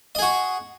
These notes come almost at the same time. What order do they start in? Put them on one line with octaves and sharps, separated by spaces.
D#5 G#4 F#4